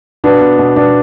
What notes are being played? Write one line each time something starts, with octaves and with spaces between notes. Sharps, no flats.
B2 B3 D4
B2
B2
B2 B3 D4